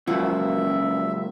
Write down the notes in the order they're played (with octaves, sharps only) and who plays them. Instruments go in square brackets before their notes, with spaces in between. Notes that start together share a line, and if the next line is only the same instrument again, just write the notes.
[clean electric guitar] C#2 F#2 [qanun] F3 F#4 F#5 [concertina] E5